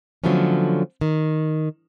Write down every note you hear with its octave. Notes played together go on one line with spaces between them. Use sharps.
D3 F3 F#3 A3 B3 C#4
D#3